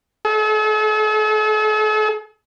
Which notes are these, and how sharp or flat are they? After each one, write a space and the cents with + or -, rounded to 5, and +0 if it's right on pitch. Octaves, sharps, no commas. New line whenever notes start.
A4 -45